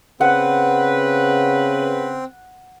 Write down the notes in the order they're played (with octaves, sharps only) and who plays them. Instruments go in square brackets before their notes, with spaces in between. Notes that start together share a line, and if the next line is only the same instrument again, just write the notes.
[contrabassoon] C#3 [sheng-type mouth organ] C4 [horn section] B4 [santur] F#5